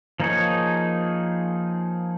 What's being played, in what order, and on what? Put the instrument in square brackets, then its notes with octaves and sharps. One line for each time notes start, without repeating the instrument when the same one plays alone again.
[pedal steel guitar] F3 A#3 D#4 G#4 C#5